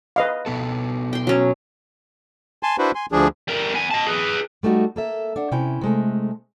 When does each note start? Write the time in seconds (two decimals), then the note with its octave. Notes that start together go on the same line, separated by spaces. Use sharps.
0.16 B4 D#5 F5
0.46 B2 B3 A4
1.13 G5 C6
1.27 F#3 C#4
2.63 G#5 A5 C6
2.78 D4 E4 F#4 B4 C5
2.95 G#5 C6
3.12 D2 F3 D4 G#4
3.48 G3 A#4
3.74 B3 G#5
3.91 D#5 A5
4.07 G#4 B4
4.63 G3 A3 D#4 F#4
4.96 A#3 A4 E5
5.36 D4 F#5
5.52 C3 C#4 E4 G5
5.81 C3 G#3 A3